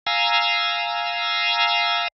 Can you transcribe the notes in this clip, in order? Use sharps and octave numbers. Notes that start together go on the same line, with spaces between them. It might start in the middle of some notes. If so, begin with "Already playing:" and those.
F5 G#5 A#5 E6